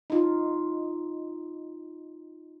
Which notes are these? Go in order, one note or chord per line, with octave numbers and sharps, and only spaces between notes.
D#4 F4